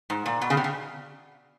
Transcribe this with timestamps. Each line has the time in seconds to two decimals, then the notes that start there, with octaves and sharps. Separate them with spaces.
0.10 G#2
0.26 A#2
0.42 B2
0.50 C#3
0.57 C3
0.64 C#3